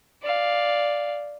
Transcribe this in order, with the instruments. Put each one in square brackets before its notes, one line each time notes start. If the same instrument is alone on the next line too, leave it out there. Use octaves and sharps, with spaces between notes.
[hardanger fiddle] D5 F5